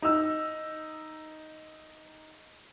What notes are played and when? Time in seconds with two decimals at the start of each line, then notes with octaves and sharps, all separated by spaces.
0.02 D#4 E6